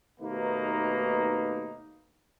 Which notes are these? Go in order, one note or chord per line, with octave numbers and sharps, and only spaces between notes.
D#2 B2 A3 A#3 D#4 B4